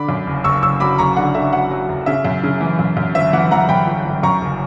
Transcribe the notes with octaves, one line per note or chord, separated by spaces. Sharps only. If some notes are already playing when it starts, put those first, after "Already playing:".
Already playing: D3 B5 D6
F#2
F#1
F#1 C#6 E6
F#1 C#6 E6
F#3 B5 D6
F#1 A#5 C#6
D3 F#5
D3 E5
F#3 F#5
F#3
F#1
C#3 E5
F#2
C#3
E3
F#2
F#2
G1 E5
E3 F#5
E3 F#5 A#5
F#2 G5 B5
G1
G1
F#2 A#5 C#6
F#1